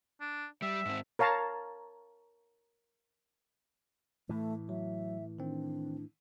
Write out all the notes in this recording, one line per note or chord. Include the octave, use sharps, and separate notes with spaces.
D4
G3 E5
G#2 C4
A#4 C#5 F5 A5 A#5
A2 E3 A3
F#3 E5
D#3 C4 D4